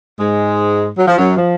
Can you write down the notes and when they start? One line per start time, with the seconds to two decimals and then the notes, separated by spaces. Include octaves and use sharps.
0.19 G#2 G#3
0.98 F#3
1.08 F3
1.18 F#2 F#3
1.37 F3